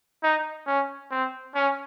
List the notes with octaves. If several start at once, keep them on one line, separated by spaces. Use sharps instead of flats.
D#4
C#4
C4
C#4